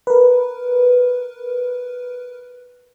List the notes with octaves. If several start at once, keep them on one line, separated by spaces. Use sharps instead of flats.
A#4 B4